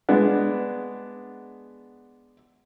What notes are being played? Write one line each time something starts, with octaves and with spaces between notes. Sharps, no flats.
G#3 B3 D4